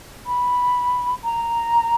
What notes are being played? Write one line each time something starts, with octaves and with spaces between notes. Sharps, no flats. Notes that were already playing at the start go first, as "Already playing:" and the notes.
B5
A#5